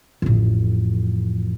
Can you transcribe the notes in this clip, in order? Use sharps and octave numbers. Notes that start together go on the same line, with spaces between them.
A1 F2